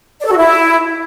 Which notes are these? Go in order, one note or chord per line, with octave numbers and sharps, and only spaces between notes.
D5
A4
F#4
E4